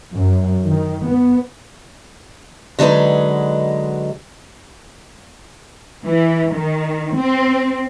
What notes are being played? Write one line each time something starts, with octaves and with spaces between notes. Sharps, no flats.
F#2
D#3
B3
D3 F#3 G#3 D#4 B4
E3
D#3
C4